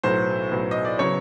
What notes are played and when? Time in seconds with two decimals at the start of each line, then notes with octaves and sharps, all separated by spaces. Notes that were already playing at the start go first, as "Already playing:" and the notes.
0.04 B1 A2 F#3 B3 C5
0.51 B1 A2 F#3 B3
0.71 D#5
0.85 D5
0.99 C#3 F#3 B3 C#5